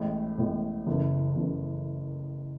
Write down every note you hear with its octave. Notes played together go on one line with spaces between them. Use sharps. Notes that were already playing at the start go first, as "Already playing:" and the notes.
Already playing: A1 A2 G#3
A1 A2 G#3
F#1 F#2 E3 A3
F#1 F#2 E3 A3